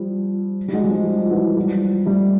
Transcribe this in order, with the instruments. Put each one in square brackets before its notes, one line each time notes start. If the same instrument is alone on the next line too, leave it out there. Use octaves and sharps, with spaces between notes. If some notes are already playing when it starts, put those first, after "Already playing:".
Already playing: [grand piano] F3 G3
G3
F#3 G#3
G#3
F3 G3
F3
E3 F#3
F3 G3
G3 A3